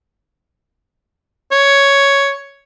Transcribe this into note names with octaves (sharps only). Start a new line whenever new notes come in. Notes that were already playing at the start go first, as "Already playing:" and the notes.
C#5